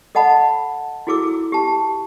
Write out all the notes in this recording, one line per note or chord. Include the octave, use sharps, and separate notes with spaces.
A4 D#5 F#5 A5 B5
E4 F#4 G#4 A4 D6 E6
G4 A5